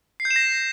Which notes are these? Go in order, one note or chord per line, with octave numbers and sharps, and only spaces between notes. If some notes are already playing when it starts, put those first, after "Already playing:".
C7
G6
E7
A#6